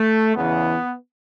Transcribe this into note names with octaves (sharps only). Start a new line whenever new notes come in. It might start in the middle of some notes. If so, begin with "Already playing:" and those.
Already playing: A3
E2 C#3 E3 B3